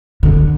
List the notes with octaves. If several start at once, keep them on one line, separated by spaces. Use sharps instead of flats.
D3